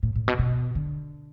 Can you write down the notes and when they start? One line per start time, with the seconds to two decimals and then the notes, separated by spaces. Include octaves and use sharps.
0.03 A2
0.16 A2
0.28 B2
0.39 B2
0.75 D3